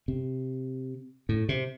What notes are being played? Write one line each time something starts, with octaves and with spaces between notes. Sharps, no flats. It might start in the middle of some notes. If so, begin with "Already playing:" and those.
C3
A2
C3